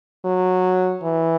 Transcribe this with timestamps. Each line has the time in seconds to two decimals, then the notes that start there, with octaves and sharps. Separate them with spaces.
0.25 F#3
1.03 E3